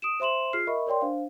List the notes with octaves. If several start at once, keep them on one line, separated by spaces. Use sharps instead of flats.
D#6 D7 E7
C5 E5 C6 E7 F#7
F4 G#4 F6 C7
A#4 D#5 E5 B5 C#6
A#4 C#5 D5 G5 C6
D4 C5 F5